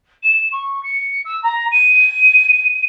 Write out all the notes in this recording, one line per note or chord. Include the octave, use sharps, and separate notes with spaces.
E7
C#6
C#7
E6
A#5
D#7